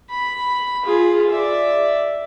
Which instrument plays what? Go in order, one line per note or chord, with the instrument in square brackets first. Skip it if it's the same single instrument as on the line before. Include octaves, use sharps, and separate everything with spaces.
[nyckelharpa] B5
F4 G#4
D5 E5